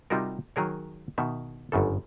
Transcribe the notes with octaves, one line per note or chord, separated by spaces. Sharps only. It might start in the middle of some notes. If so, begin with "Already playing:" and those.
C3 G3 D#4 F4 F#4 A#4
D#3 F#3 G#4 A#4 C#5
B2 D#3 E5
G1 F#2 C#3 A4